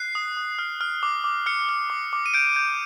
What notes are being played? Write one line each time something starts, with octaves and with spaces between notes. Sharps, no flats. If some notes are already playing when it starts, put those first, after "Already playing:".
Already playing: F#6 C7
D#6
D#6
F6
F6
D6
D6
F6 C#7
F6
D6
D6
D#7
G6 D7
G6